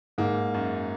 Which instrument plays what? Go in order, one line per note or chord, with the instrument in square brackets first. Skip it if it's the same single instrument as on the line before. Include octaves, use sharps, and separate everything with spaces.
[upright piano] G#2 [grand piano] A#3
[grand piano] F#2